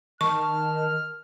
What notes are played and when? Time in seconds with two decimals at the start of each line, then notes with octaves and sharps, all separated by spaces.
0.21 D#3 A5 C#6 F6